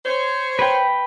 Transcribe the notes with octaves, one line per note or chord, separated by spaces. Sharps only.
C5 C#5
B4 G5